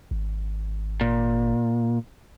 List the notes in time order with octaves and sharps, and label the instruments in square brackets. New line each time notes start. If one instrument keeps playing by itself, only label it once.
[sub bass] G#1
[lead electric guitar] A#2